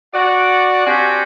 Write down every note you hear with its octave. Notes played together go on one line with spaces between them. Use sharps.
F#4 D5 F#5
C4 D4 F#4 G4 F#5 G#5